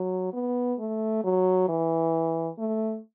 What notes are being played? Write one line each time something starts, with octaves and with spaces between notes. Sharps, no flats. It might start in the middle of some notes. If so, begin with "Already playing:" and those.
Already playing: F#3
B3
A3
F#3
E3
A3